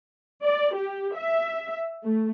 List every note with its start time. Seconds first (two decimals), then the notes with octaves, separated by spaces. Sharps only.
0.44 D5
0.75 G4
1.17 E5
2.03 A3